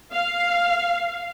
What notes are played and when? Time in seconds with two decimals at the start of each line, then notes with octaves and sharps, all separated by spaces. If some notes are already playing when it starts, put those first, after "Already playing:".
0.13 F5